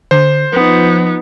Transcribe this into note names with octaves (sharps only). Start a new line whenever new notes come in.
D3 C5
F3 B3 D#4